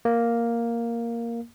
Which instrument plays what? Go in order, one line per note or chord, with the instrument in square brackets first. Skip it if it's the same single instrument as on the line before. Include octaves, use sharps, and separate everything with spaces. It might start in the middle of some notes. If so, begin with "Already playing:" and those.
[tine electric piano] A#3